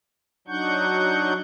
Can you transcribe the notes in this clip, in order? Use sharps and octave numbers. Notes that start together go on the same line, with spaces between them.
F#3 D4 D#4 F#5 C#6 G6